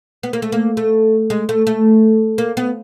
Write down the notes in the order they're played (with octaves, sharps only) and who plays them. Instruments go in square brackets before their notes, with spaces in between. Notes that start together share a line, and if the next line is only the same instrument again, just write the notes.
[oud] B3
A#3
A3
A#3
A3
G#3
A3
A3
A#3
B3